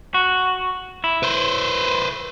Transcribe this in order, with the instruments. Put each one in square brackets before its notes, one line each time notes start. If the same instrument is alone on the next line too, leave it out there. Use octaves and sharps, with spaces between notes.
[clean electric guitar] F#4
E4
[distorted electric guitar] B4 C5